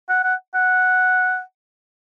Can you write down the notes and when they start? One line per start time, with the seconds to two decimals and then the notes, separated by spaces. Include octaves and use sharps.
0.09 F#5
0.24 F#5
0.55 F#5